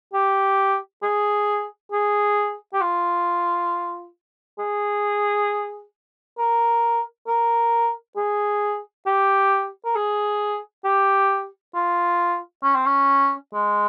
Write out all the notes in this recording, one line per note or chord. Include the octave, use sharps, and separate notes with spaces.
G4
G#4
G#4
G4
F4
G#4
A#4
A#4
G#4
G4
A#4
G#4
G4
F4
C#4
C4
C#4
G#3